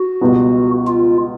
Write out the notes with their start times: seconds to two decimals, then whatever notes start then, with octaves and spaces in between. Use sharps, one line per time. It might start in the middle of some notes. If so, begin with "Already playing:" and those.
Already playing: F#4
0.21 C#2 B2 G3 B3
0.88 F4